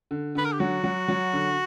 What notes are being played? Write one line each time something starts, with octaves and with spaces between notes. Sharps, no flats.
D3
D3 B4
A#4
G4
F#3 F#4
F#3
F#3
D3